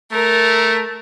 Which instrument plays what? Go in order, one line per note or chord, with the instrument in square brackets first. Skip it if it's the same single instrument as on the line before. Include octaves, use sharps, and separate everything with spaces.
[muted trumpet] A3 [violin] A#4